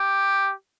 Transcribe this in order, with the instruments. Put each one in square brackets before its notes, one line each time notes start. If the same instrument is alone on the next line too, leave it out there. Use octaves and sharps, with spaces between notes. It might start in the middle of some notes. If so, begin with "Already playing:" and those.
Already playing: [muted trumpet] G4